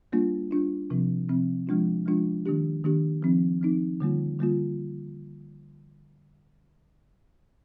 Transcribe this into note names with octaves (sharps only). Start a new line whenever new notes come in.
G3 A#3 D4 F4
G3 A#3 D4 F4
C3 F3 C4
C3 F3 C4
F3 G#3 D4 F4
F3 G#3 D4 F4
D#3 A#3 D4 G4
D#3 A#3 D4 G4
F3 C4 D#4
F3 C4 D#4
D3 G3 A#3 F4
D3 G3 A#3 F4